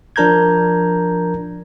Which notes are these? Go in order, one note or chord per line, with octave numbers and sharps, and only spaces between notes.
F3 D4 A#4 A#5 G6 G#6